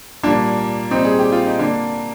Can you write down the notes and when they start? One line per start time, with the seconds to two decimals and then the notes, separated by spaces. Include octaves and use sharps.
0.23 A#2 G3 A#3 D4
0.91 A#2 G3 C4 D#4
1.05 G#4
1.19 G4
1.32 F4
1.46 D#4
1.59 D3 A#3 D4